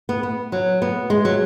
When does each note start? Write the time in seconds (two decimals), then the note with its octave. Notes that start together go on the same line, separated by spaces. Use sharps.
0.09 B3
0.23 B3
0.52 F#3
0.82 B3
1.10 G#3
1.25 F#3